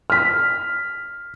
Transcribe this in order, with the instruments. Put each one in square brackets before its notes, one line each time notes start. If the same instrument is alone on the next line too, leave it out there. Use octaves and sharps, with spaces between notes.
[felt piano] F6 B6